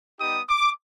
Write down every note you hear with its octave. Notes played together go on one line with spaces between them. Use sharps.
G3 B3 D#4 G4 D#6
D6